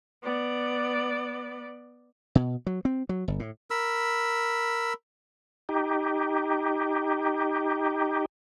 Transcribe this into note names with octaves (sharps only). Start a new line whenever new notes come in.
B3 D5
B2
F#3
C4
F#3
G1
A2
A#4 B5 E6
D#4 G4